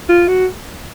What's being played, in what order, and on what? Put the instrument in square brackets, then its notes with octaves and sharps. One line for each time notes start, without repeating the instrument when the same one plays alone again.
[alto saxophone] F4
F#4